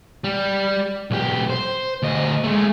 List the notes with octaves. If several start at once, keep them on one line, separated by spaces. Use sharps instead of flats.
G3
B1 G4
C5
D2 D#5
G#3 A3